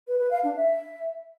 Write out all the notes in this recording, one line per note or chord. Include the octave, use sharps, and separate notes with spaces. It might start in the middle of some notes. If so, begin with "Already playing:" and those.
B4
B4
F5
D4
E5